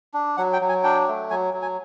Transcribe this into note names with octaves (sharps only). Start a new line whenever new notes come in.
D4
F#3 F#5
G5
F#3
G#5
D4 G5
A3
F#3 G#5
F#3
G#5